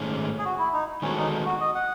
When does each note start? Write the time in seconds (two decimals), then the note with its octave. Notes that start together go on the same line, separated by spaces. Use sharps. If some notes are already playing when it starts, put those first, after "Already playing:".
Already playing: G#2 D#3 A3 C#4 G#4
0.39 G#4
0.45 F#4
0.59 E4
0.74 D#4
1.02 D#3 G#3 B3 C#4 F#4 A4
1.18 D#4
1.45 F#4
1.61 D#5
1.75 F#5